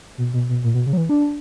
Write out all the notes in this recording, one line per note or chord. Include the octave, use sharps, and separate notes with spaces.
B2
B2
B2
A#2
B2
C#3
F#3
E3
D4